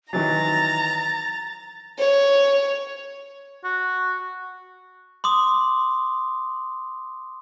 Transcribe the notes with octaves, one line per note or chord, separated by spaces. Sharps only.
D#3 E3 F#3 A#5 A6
C#5
F#4
C6 D6 D#6